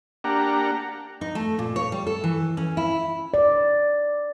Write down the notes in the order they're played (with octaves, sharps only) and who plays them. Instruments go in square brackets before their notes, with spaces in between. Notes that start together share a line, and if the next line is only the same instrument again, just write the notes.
[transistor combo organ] A#3 D4 G4 F#5 A#5
[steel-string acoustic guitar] D#4
A3
A#2
C#5
G3
A4
E3
C#4
E4
[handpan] D5